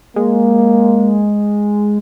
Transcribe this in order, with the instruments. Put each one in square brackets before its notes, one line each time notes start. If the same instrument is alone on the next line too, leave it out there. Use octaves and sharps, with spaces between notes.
[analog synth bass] G#3 [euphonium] A#3